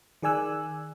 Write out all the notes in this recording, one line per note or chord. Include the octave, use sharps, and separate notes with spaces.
D#3 G#4 D5 G#5 E6 F#6